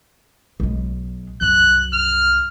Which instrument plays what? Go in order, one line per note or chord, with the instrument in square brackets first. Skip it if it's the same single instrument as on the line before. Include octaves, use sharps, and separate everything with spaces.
[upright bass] B1 G#3
[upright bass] C2 F#2 [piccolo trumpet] F#6
[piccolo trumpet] F6